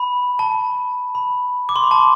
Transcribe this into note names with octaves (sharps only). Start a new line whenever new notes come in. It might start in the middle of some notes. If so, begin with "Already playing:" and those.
Already playing: B5
A5
B5
D6
C6
B5
A5